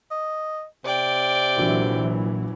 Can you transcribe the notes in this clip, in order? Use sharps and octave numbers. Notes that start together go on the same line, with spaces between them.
D#5
C3 D5 G5
A#1 A#2 E3 F#3 F#4